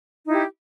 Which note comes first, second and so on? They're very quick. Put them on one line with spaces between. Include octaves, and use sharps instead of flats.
D#4 E4 G4